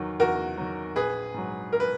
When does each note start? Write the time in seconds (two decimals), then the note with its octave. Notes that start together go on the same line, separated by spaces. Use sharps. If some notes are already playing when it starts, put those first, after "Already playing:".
Already playing: E2 D#3 F#3
0.20 E2 F#4 A#4
0.58 D#3 F#3
0.96 A#1 G#4 B4
1.34 G#2 F#3
1.73 A#4
1.80 B4